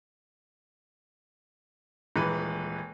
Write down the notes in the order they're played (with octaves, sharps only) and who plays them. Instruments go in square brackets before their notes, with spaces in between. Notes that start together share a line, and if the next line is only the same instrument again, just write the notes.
[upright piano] D#1 E3 G#3 B4